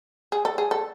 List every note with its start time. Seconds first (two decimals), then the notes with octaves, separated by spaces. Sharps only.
0.32 G#4
0.45 A4
0.58 G#4
0.71 A4